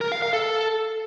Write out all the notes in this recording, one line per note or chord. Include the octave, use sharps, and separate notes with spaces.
A#4
F5
F5
A4